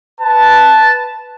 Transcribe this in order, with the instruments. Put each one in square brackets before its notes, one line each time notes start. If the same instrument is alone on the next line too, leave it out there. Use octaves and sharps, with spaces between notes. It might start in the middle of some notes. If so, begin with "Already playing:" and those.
[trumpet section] B4 A5